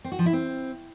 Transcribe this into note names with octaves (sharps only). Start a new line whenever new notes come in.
C4
F#4
F3
E4
C4